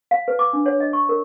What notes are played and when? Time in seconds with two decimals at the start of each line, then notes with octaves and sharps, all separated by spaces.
0.11 F5
0.28 B4
0.39 D6
0.53 D4
0.66 C#5
0.80 D#5
0.93 C#6
1.09 A#4